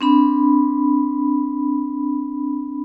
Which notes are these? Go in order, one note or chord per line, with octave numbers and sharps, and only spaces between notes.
C4 D4 B5